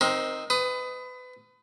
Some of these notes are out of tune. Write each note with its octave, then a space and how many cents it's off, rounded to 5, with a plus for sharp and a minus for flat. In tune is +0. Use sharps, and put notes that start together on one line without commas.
C4 +0 D#4 +0 A#4 +30
B4 +30 D#6 +0